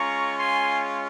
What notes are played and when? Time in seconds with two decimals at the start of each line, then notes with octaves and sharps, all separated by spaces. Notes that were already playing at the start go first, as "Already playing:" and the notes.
Already playing: G#3 C#4 F4 A#5 C#6
0.38 G#5 C6